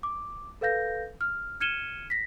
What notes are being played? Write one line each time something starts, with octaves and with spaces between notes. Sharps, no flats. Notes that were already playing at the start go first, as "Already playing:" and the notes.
D6
A4 B4 F5 G6 A#6
F6
F6 G#6 C#7 D#7 E7 G7
A#6 B6